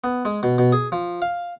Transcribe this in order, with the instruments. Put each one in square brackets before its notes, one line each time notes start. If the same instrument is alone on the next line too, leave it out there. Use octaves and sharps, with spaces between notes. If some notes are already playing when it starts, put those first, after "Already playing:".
[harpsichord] B3
G#3
B2
B2
G#4
F3
F5